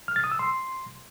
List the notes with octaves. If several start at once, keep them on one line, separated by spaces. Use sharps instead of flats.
F6
A6
D#6
E6
C6